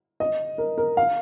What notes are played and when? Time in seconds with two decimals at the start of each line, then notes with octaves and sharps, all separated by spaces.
0.20 D#5
0.58 A#4
0.78 A#4
0.97 F5